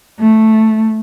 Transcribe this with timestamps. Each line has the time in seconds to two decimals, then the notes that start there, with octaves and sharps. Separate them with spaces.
0.20 A3